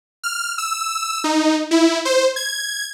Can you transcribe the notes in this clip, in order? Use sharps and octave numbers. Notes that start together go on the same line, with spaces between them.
F6
E6
D#4
E4
C5
G#6